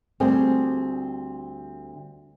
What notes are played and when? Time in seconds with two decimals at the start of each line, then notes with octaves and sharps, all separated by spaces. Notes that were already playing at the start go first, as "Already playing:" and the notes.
0.20 D2 G3 C4 G#4 C5